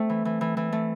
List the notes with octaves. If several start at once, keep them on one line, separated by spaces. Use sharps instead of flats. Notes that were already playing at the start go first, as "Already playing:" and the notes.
Already playing: A3 C4
E3
E3
E3
E3
A3